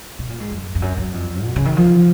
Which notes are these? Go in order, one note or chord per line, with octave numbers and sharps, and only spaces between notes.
B2
A#2
G#2
F#2
F2
F#2
F#2
F2
B2
C#3
D#3
F3